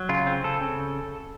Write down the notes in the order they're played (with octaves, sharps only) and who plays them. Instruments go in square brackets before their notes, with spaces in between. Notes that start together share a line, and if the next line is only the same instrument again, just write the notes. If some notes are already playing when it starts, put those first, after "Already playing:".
Already playing: [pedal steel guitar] F#3
C#3 F4
C4
C#3 A4
C#3